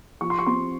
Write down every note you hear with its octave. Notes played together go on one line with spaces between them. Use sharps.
F3 C#6
C6
C#6
C4 C6